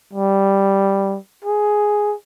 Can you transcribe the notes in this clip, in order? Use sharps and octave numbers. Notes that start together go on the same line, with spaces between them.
G3
G#4